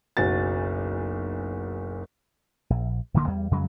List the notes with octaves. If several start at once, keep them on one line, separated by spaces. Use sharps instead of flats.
F#1 B1 F#4 A6
A#1
D1 D2 D3 A#3
E2 G3
F2 C#3 F#3 G#3